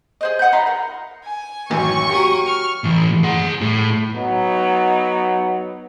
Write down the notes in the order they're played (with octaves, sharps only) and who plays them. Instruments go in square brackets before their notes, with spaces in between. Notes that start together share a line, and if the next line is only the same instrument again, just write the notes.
[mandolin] G#4 C5 D#5
D#5 F#5 B5 G6
D#4 F4 B5 C6
A#4
[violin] G#5
[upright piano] A1 F#2 D#3 [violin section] C#6
[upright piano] F#3 G4 [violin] A#3 D#7
[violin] C#6 F6
[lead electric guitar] A2 E3
G#4 F#5
A2
[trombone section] F#3 B3 D#4